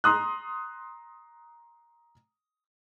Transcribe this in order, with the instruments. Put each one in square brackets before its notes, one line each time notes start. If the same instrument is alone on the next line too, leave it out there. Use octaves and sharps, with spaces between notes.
[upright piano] A#5 C6 D#6 F#6